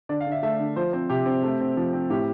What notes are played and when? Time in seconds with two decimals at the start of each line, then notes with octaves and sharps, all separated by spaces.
0.09 D3 D5
0.21 F5
0.26 D3
0.32 E5
0.42 A3 E5
0.60 D3
0.76 F3 C5
0.93 C4 C5
1.10 C3 G4
1.26 C4
1.43 A3
1.61 C4
1.77 F3
1.93 C4
2.10 A2 G4